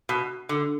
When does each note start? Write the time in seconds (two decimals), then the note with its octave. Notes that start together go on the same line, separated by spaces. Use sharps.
0.09 B2
0.49 D3